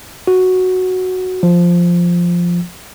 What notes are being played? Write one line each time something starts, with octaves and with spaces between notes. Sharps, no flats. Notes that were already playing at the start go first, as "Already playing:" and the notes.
F#4
F3